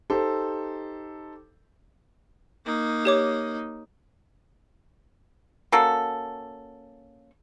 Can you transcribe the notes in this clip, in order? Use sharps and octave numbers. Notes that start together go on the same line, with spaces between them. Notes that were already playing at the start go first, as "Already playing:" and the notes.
D#4 G4 A4 C5
A#3 D#4
G4 C#5 D6
A#3 C#4 F#4 A4